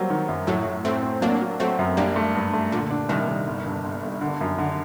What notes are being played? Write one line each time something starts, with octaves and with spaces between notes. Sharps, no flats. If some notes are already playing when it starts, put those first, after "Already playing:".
Already playing: F#3 G3 A#3 C4
D#3
F#2
A2 F#3 A3
A2
A2 A3 C4
C4
F#3 A#3 D4
F#3
F#3 A3 C4
F#2
G3 A#3 D4
A3
G2
A3
A#2 D3
D4
C2 D#3
C2
G1
G2
G1
G1
D3
F#2
D3